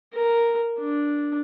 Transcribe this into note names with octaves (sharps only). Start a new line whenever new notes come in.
A#4
D4